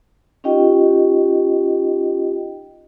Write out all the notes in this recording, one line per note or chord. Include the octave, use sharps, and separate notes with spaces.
C#4 D#4 F4 G4 D#5 G5